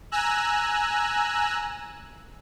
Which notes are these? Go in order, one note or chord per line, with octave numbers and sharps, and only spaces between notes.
G#5 A#5 E6 F#6